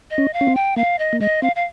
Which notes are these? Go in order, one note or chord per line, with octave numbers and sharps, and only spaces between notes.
D#5
C#4
F5
C#4
C4
G5
A#3 F5
D#5
A#3
G#3 D#5
C4 F5
F5